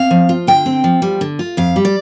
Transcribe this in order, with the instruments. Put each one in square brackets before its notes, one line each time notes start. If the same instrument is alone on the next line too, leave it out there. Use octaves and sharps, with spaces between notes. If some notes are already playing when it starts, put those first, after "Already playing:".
Already playing: [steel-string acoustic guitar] C4 F5
F3
F4
D3 G5
C4
F3
G3
D3
F4
F2 F5
G3
D5